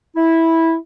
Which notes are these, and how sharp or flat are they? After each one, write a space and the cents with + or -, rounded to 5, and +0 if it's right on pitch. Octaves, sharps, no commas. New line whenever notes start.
E4 -10